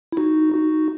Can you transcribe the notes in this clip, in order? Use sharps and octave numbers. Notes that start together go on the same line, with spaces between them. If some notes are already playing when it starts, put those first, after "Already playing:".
E4
D#4 F#4
D#4 F#4